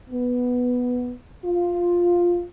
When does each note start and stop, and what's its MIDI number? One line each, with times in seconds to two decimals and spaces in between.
0.11 1.12 59
1.45 2.42 65